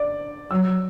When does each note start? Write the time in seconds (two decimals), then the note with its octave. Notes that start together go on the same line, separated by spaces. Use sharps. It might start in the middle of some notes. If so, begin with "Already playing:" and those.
Already playing: D5
0.51 F#3 E6